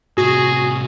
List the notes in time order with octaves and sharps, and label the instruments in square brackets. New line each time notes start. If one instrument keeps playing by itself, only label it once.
[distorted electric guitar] A2 C3 [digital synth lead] F#4 [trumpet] G#4